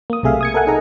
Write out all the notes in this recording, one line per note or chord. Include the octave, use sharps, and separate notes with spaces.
A#3 D#6
B1 C3 A3 G#4 E5 F5
D#6 G#6 C#7
A4 A#4 E5 F#5 G#5
D#4 G#4 A4 A#5